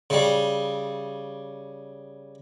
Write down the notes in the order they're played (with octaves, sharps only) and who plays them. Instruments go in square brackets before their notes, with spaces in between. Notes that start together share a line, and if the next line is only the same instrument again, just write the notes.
[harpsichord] C#3 G3